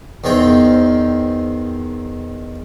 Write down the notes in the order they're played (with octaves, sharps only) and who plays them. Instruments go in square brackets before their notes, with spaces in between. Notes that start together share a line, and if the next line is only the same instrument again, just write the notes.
[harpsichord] E2 D#3 C4 G5